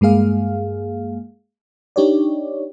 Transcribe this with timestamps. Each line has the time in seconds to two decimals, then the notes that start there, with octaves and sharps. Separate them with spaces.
0.01 G2 G#3 A#3 G#4 F5
1.96 D4 D#4 G4 C#5 D5